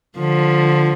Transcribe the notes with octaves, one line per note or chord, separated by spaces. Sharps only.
D3 F3